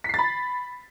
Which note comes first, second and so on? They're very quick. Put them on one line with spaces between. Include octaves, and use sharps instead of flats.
B6 C7 A6 B5